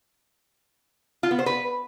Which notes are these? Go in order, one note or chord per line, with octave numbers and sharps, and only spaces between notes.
F4
B3
C5
B4